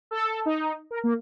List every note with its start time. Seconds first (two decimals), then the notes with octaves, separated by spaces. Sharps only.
0.11 A4
0.46 D#4
0.91 A#4
1.04 A#3